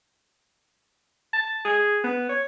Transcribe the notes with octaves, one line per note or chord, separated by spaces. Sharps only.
A5
G#4
B3
C#5